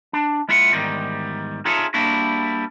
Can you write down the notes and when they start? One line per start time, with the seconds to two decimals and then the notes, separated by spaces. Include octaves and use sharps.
0.13 D4
0.49 G#3 E4 F4 E5 F#5
0.73 E2 G#2 D#3 G3
1.65 D#4 F4 G#4 A4 C#5 E5
1.94 G3 A#3 D4 E4 F#4